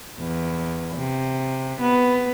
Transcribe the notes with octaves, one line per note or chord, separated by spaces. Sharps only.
E2
C3
B3